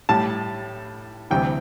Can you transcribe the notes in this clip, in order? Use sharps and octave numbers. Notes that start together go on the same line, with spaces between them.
A2 G3 A5
D2 C3 E3 G3 G5